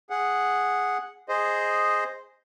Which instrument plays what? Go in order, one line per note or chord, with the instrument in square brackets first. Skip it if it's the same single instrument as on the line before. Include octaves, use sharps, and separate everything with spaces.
[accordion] G#4 F#5
G#4 C5 D#5